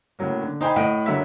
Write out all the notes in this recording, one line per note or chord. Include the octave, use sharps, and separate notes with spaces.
A2 C#3 F#3 A#3
D3
D#4 C5 G5 G#5 A#5 B5
A2 D#5 F#5 D7
F#1 D3 F#3 E5 E6 B6